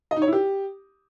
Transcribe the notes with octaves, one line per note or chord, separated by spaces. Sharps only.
D#5
D#4
C#5
E4
G4